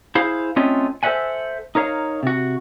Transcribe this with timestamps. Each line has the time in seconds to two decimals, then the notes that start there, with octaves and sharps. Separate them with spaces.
0.15 E4 G#4 C5 F5
0.56 A3 C4 C#4 F4 C#5 D#5
1.03 A4 C5 D#5 E5 F#5 G#5
1.75 D#4 A#4 C#5 F5
2.23 C3 F#4